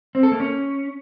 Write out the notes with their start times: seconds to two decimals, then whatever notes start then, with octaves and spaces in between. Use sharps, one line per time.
0.15 C4
0.23 A4
0.32 A#3
0.40 C#4